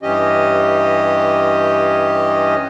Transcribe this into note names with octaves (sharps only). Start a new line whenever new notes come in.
G2 E3 C#4 G4 D#5